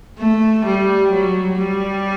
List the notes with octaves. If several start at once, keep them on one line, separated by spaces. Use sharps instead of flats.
A3
G3
F#3
G3